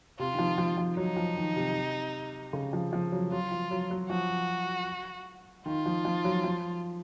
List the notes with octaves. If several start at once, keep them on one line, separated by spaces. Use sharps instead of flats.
C3 F4
D#3
F3
F3
F3
F#3 D#4
F3
D#3
C3
C#3
F3
F3
F#3
F#3 F4
F3
F#3
F#3
F3 F#4
D#3 F4
F3
F3
F#3
F3